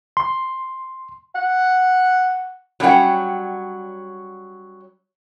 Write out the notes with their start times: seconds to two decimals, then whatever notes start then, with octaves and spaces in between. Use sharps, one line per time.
0.17 C6
1.35 F#5
2.80 F#3 G3 C#4 C#5 F#5 G5